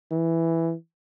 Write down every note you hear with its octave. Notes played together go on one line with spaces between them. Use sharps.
E3